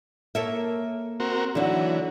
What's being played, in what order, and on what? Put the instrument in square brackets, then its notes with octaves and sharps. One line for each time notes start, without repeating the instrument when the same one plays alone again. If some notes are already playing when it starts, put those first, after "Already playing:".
[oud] A#3 A4 C#5 [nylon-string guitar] E5
[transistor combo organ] C4 F#4 A#4
[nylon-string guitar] D3 F#3 [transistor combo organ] E3 [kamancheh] D#4 F#4